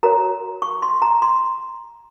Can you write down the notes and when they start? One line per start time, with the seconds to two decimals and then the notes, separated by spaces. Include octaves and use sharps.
0.03 F#4 A#4 C#5 A#5
0.62 C#6
0.82 C6
1.02 A#5
1.22 C6